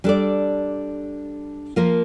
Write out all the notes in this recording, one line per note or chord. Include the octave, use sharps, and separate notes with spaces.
G3 D4 A4 D5
F3 A#3 F4 A#4